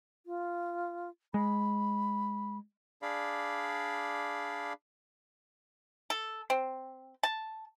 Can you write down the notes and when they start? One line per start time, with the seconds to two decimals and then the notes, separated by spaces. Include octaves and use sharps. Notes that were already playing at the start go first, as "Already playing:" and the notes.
0.26 F4
1.34 G#3 B5
3.02 D4 G#4 D5 F5 B5
6.10 A4
6.50 C4
7.23 A5